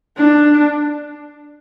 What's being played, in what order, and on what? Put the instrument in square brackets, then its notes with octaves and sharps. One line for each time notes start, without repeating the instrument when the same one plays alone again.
[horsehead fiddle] D4